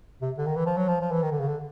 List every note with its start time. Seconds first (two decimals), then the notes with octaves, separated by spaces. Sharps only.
0.22 C3
0.38 D3
0.46 D#3
0.56 E3
0.66 F3
0.77 F#3
0.88 F3
1.01 F3
1.12 E3
1.23 D#3
1.31 D3
1.40 C#3
1.48 D3